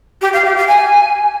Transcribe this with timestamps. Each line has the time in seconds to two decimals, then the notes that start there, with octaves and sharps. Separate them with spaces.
0.21 G4
0.33 F5
0.44 G4
0.56 F5
0.67 G#5